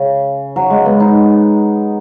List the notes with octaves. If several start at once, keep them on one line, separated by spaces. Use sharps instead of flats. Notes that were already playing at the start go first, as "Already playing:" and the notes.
Already playing: C#3
F#3
G#3
B3
D#4